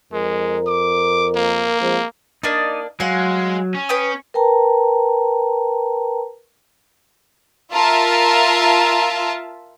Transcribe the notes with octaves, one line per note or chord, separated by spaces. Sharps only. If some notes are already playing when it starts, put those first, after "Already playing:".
F2 G#3 A#4
D6
A#3
F3 G#3 C4
A#3 D4 D#4 D5 D#5
F#3 G#3 F5 F#5
C#4
B4 G5 D#6
A#4 B4 G5 A5 A#5
F4 A#4 E5 A5